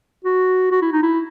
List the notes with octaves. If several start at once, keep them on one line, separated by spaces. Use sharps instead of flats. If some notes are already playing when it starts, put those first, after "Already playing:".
F#4
F#4
E4
D#4
E4